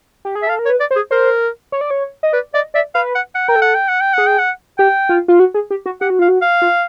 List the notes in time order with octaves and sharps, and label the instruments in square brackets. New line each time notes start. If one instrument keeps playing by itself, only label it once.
[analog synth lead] G4
G#4
[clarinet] E5
[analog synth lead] A4 [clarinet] F5
[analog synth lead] A#4
[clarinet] C#5
[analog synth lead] B4
[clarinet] D5
[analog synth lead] C5
[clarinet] G#4
[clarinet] A#4 [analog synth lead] C5
[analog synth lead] C#5
D5
C#5
D#5
[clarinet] B4 [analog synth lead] D5
[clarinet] D5 [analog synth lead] D#5
[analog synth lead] D5 [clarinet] E5
[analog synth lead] B4 [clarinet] F5
[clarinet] F#5
F#5
[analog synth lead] A#4 [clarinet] G5
[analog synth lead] A4
[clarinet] F#5
G5
F#5
G5
[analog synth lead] G#4 [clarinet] F#5
[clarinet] G5
F#5
[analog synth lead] G4 [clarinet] G5
[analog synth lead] F4
F4
F#4
G#4
G4
F#4
[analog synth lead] G4 [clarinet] F#5
[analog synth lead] F#4
[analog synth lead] F4 [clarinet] F5
[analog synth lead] F#4
[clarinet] F5
[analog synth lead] F4